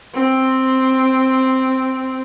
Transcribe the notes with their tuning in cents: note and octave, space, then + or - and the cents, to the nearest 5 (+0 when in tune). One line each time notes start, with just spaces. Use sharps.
C4 +0